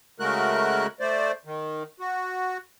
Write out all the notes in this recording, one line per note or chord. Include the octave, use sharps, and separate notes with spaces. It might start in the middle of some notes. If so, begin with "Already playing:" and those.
C#3 G#3 A3 F#4 A#4 F#6
A3 C5 D5
D#3
F#4